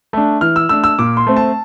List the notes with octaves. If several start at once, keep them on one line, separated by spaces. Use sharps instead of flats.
A3 D4
E3 F6
E6
A3 D4 E6
E6
A#2 D6
C6
A3 C4
A5